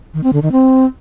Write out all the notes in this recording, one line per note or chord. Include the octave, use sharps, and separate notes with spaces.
D#3
C4
D3
D#3
C4